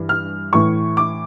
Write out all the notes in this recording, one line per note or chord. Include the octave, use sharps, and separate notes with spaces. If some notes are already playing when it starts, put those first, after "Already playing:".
Already playing: G2 E3
F6
A2 E3 C#6
D6